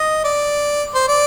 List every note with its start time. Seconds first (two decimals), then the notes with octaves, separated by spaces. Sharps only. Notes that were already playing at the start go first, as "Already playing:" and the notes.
Already playing: D#5
0.24 D5
0.94 C5
1.08 D5